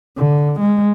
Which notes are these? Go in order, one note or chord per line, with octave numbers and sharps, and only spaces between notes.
D3
G#3